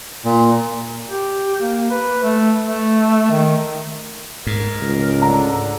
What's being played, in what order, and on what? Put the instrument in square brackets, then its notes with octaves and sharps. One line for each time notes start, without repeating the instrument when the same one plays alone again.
[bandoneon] A#2
[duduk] G4
A#3
B4
A3
A3
D#3
[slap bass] G#2 [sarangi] A#4
[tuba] C#2
[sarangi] D3 [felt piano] A#5